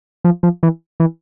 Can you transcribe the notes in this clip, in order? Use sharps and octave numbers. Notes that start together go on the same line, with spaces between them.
F3
F3
E3
E3